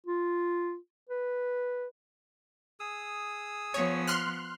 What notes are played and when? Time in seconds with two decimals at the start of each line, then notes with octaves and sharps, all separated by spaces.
0.06 F4
1.09 B4
2.80 G#4 D#6 E6
3.74 F3 B3 C#5
4.07 C6 F6 F#6